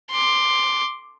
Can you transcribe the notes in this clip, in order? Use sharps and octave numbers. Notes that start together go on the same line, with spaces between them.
C6 D6